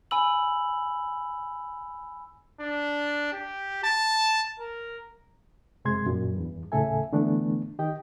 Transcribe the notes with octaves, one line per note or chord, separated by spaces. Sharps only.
G#5 B5 E6 F#7
D4
G4
A5
A#4
F#2 C3 G#3 C6 G#6
F#2 A#2
E2 G2
D#2 A2 C#3 A4 E5 G#5
D3 E3 A3 B3 D4
D#3 G4 D#5 G5